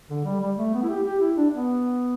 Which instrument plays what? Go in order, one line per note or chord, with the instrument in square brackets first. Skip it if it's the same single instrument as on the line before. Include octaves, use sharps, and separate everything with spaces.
[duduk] D3
G3
G3
A3
B3
E4
G4
G4
E4
D4
B3